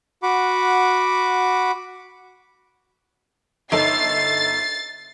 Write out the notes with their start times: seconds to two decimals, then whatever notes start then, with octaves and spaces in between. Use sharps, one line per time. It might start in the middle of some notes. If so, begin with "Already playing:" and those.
0.23 F#4 F#5 B5 D6
3.72 G1 D#4 A4 A6 C7